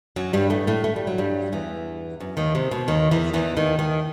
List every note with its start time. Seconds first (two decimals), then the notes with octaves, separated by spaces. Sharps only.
0.16 F#2 F#3
0.33 G2 G3
0.50 A2 A3
0.67 A2 A3
0.84 A3
0.96 G3
1.07 F#3
1.18 G2 G3
1.52 E2 E3
2.20 F#2
2.37 D#2 D#3
2.55 C3
2.71 B2
2.88 D#2 D#3
3.11 E2 E3
3.34 E2 E3
3.56 D#2 D#3
3.79 D#2 D#3